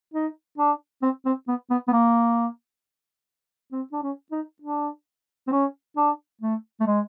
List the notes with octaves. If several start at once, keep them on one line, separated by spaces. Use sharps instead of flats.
D#4
D4
C4
C4
B3
B3
B3
A#3
C4
D4
C#4
D#4
D4
C4
C#4
D4
A3
A3
G#3